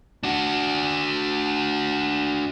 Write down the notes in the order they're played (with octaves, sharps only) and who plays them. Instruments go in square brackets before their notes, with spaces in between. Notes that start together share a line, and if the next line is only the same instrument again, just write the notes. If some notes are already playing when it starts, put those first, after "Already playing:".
[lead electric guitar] D4 F#4